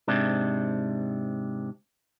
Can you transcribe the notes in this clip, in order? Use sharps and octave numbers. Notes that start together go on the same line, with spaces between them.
G#2 C3 D4